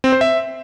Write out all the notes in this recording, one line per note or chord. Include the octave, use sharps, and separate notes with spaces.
C4
C5
E5